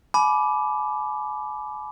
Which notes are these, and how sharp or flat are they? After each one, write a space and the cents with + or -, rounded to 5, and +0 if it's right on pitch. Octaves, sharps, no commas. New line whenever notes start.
G#5 +40 B5 +0 D6 +0